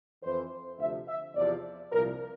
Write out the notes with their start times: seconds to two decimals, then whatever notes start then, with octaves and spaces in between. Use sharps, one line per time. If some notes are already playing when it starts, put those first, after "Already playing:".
0.23 F2 E3 C5
0.79 D2 C3 F3 E5
1.07 E5
1.35 E2 C3 F3 D5
1.91 C2 A#2 F3 A#4